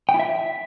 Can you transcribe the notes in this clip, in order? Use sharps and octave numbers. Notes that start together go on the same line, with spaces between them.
G5
E4
E5